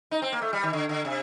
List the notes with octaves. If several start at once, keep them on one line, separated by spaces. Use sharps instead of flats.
D#4
C4
A#3
A3
G3
D#3
D3
D3
C3